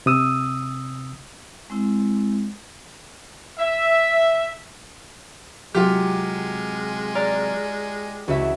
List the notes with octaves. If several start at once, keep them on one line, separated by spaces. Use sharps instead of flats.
C3 D#6 E6
G#3 C4 E4
E5
C3 F#3 G#3 F4 G4
D5 A#5 F6
C#2 E4 F#4 E5